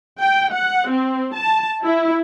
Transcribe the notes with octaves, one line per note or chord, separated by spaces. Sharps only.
G5
F#5
C4
A5
E4